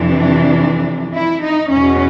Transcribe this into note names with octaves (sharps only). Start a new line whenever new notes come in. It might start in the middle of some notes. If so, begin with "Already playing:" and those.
Already playing: F2 C3 E3 D4
E4
D#4
E2 C#4
B2